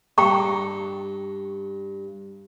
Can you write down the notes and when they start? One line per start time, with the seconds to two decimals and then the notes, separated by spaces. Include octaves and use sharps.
0.18 G2 G5 A#5 C#6